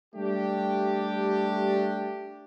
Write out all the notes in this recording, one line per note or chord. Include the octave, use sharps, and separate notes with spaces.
G3 A3 D4 G4